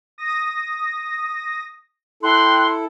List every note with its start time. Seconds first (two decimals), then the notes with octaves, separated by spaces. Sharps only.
0.18 D#6 A#6
2.23 E4 A4 G5 C6 F#6